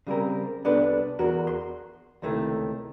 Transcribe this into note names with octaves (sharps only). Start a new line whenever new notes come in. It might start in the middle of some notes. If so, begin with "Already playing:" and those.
C#3 G3 C4 A#4
C2 B3 D4 A4 B4
E2 F#4 A#4
C6
C#2 C3 D#3 A3 E4